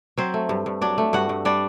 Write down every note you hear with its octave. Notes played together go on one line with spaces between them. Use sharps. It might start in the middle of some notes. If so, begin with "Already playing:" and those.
F#3 C4 C5
A3
G2
G2
F#3 D4 D5
A3
G2 F#4 F#5
G2
G3 D4 D5